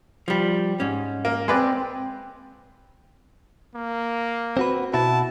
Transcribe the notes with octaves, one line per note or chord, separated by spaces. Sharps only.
F3 G3
G#2 C#4
A#3
G#3 C4 B4 D5
A#3
C4 F#4 B4
B2 E4 F#4 A5